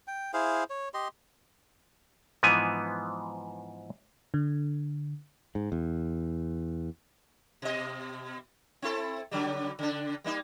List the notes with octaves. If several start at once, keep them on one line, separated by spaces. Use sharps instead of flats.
G5
E4 G#4 C5 F5
C#5
G4 D#5 C6
G#2 E3 F3 B3 G#5
D3
G#2
E2
B2 D#5
C4 E4 A4
C#3 F#3 G3
C#3 D4
G3 A#3 D#4